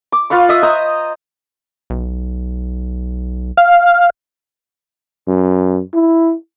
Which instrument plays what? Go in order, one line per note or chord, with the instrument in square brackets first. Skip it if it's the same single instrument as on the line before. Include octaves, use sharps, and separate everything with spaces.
[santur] D6
F4 B4 F5 C#6
D#5 E5 D#6
C5 D#5 A#5
[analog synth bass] B1
[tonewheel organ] F5
[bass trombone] F#2
E4